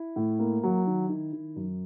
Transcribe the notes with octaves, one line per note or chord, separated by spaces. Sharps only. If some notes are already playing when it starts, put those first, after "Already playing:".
Already playing: E4
A2
A#3
F#3
D#3
D#3
D#3
F#2